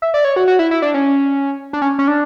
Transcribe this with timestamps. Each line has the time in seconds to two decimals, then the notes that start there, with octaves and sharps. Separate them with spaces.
0.02 E5
0.14 D5
0.25 C#5
0.36 F#4
0.48 F#4
0.59 E4
0.71 E4
0.82 D4
0.94 C#4
1.73 D4
1.82 C#4
1.99 C#4
2.08 D4